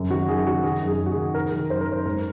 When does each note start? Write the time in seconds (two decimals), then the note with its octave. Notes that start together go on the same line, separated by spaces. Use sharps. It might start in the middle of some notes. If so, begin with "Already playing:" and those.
Already playing: F#2 C#3
0.10 D#3 F#4
0.28 F#2 G#4
0.46 D#3 F#4
0.63 D#3 G#4
0.82 F#2
0.87 G#4
0.99 F#2
1.06 F#4
1.11 G#4
1.17 D#3
1.34 D#3 A#4
1.52 D#3
1.70 F#2 C5
1.81 A#4
1.88 F#2 C5
2.06 G#2 A#4